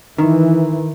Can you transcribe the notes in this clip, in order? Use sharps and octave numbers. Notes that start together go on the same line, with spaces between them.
D#3 E3